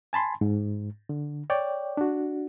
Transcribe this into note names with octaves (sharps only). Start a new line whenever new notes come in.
G#5 A5 B5 C6
G#2
D3
C#5 D5 G5
D4 F#4